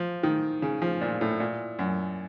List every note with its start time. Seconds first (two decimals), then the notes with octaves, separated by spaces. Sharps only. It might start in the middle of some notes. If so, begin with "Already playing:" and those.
Already playing: F3
0.23 D#3
0.62 C#3
0.82 F3
1.01 A#2
1.21 A2
1.40 A#2
1.79 F#2